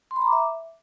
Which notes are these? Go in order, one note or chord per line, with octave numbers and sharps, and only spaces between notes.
C6
B5
A#5
D6
E5